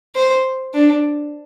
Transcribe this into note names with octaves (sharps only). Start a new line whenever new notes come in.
C5
D4